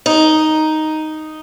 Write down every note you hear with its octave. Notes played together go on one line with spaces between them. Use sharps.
D#4